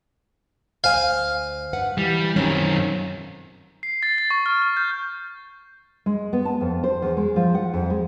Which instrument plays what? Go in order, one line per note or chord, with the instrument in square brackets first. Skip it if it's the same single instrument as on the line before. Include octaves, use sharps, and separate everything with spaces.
[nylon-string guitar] D2 C5 G#5 [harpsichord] F5
[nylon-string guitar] G2 B4 F#5
[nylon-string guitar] E3 [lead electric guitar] G3
[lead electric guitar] F#2 D#3 [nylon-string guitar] C4 C#4
[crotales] C7
A6
A6
C#6
F6
F6
G6
[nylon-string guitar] G#3
B3
A5
F2
C5
E2
G#3
F3
F#5
F2
G#3